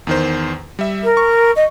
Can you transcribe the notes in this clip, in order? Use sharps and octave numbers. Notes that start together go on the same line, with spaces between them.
E2 D#3 C5
G3 E5
A#4
C#6
D#5